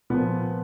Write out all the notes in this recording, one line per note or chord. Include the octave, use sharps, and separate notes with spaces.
A#2 F3 B3